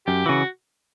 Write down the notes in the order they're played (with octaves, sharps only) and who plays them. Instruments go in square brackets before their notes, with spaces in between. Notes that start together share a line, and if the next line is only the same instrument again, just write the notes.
[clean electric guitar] F#2 [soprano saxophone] G4
[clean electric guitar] C#3 E3 [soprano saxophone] F#4